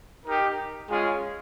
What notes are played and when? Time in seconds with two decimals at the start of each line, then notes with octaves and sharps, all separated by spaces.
0.26 D#4 G4 A#4
0.90 G#3 C#4 F4 G#4